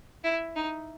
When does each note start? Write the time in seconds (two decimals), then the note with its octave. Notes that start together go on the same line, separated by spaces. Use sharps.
0.24 E4
0.56 D#4